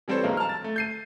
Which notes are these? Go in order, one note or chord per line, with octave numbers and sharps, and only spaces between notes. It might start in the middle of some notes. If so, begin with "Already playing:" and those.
E3 G3 C4 A4 C5 C#5
B1 G#3 A#3
A5 F6
A6
A3
G6 C7 D#7